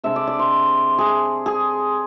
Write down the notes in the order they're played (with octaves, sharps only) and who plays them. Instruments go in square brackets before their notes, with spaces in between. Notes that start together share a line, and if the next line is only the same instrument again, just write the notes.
[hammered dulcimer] C3 G#3 D4 E5
D5
D5
C5
G#4
G#4